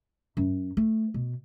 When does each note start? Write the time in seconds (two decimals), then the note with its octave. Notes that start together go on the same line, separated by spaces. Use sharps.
0.37 F#2
0.77 A3
1.14 B2